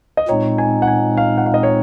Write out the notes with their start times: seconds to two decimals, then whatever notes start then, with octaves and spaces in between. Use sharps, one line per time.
0.17 D#5
0.28 A#2 G#3 C4 D#4 C#5
0.58 G#5
0.82 F#5
0.88 G#5
1.17 F5
1.38 F#5
1.46 F5
1.54 D#5
1.63 C#5